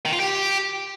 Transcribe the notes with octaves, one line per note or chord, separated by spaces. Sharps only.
D#3
F4
G4